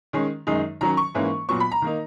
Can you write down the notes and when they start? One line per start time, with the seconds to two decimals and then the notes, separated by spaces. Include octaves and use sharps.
0.13 D#3 G#3 C#4
0.47 F#2 D#3 G#3 D#4
0.81 D#3 F#3 C#4 A#5
0.97 C#6
1.15 G#2 E3 A#3 C#4
1.49 A#2 F#3 B3 C#6
1.60 B5
1.72 A#5
1.82 D#3 A#3 D#4